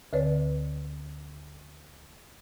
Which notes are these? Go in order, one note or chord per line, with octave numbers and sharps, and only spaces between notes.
D2 D3 B4 C#5 D5